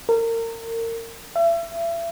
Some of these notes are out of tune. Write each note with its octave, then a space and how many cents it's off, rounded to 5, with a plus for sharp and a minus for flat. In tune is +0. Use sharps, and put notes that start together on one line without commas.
A#4 -30
E5 +35